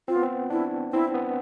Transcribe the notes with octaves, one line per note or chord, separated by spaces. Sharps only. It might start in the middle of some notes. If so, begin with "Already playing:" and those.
C4 F4
B3
C4
D4 E4
C4 E4
B3